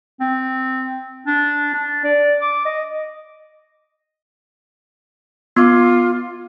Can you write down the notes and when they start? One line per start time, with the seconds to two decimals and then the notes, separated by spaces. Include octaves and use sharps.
0.21 C4
1.27 D4
1.74 D4
2.04 D5
2.41 D6
2.65 D#5
5.56 B3 F4 D6